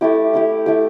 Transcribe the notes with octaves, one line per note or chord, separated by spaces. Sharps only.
A3 E4 G4
A3 E4 G4
A3 E4 G4